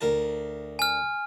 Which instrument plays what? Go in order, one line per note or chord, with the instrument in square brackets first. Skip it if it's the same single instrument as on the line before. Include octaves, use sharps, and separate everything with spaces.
[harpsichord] D2 A#4 A5
[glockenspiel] G#5 F6